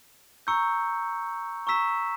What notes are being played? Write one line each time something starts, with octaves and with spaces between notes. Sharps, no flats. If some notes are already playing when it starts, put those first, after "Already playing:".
A#5 C#6 E6 G6 C#7
A#5 C#6 E6 B6 E7